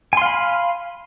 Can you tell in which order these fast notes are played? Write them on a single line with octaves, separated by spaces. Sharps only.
G#5 C6 F5 B5